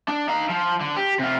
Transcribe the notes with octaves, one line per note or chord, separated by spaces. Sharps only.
D4
D#4 F5
F3
D3
G4
C3 F4